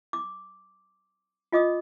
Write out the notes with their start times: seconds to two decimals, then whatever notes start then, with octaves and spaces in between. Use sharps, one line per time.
0.13 D6
1.52 F4 D#5 D6 D#6